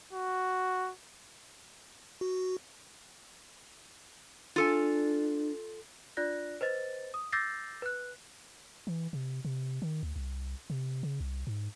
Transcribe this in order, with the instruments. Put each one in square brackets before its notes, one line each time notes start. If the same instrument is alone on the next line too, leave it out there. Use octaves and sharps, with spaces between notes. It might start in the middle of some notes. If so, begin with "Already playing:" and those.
[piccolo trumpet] F#4
[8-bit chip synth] F#4
[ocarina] D4 [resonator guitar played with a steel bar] F4 A4 G#5
[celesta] D4 F4 D5 F#6 A#6
B4 C5 D#5 A6
D#6
D6 E6 G6 A6 A#6 C7
B4 F#6
[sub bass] E3
C3
C3
D#3
D2
C2
C3
C#3
C2
G#2